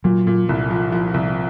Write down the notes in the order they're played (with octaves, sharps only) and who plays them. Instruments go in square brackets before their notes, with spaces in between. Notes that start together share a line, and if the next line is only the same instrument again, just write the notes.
[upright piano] A#2 [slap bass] F#3
[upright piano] A#2
C2
F3
F3
C2